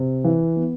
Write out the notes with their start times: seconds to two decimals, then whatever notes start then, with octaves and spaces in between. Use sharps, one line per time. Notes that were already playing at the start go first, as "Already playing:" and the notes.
Already playing: C3
0.24 E3
0.56 B3